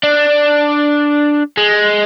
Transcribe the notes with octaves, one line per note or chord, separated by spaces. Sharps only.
D4
G#3